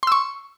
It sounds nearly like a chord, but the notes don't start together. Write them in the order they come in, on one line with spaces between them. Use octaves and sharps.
C6 E6 C#6